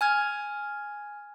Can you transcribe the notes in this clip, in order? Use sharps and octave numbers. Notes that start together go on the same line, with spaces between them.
G#5 F6 G#6